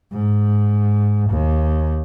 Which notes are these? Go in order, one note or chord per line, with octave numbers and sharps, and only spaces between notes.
G#2
D#2